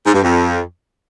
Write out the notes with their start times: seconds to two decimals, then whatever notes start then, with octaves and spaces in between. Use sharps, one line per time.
0.06 G#2
0.14 G2
0.22 F2